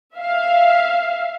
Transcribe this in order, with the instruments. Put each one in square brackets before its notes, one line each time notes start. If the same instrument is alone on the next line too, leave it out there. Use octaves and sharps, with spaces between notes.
[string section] E5 F5